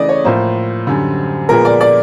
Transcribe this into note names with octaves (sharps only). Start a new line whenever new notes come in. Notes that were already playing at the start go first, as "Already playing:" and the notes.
Already playing: C#3 E3 A3 D5 D#5
C#5
A2 F3 A#3 C5
F#2 D3 G3
A#2 F3 G#3 B3 A#4
D5
D5